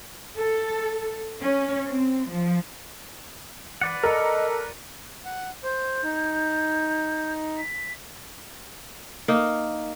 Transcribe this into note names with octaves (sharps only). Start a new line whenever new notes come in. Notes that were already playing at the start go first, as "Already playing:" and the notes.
A4
C#4
C4
F3
E3 B4 D5 F#5
A4 A#4 D#5
F#5
C5 G6
D#4
B6
A#3 D#4